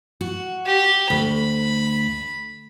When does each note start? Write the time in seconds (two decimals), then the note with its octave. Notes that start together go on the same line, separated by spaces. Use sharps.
0.21 F#4
0.66 G4
1.10 D2 B5